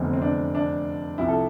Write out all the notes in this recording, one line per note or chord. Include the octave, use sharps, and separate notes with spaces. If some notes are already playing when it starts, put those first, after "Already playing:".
Already playing: F1 E2 D3 C4
C4
D4
D4
C2 C3 F3 E4
A4